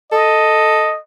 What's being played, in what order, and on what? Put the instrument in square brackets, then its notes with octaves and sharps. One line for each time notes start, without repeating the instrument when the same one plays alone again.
[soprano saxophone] A4 [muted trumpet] D#5